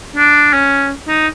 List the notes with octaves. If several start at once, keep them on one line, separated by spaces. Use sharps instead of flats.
D4
C#4
D#4